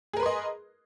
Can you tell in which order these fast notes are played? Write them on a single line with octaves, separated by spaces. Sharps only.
G#4 A#4 B4 C6 D#5